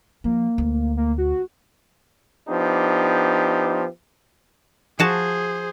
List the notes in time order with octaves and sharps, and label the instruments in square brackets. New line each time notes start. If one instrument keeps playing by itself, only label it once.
[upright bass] F3 [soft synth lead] A#3
[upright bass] D2
[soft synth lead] A#3
F#4
[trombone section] F3 B3 D4 D#4 G4
[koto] F3 F#4 A5 [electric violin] G#4 C5